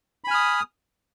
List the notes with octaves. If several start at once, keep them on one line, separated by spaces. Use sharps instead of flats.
G#5 B5 D#6 F6